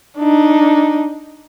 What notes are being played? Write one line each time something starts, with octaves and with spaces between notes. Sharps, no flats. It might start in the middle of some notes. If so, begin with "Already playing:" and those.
D4 D#4